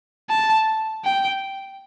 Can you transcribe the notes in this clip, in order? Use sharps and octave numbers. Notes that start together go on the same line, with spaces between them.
A5
G5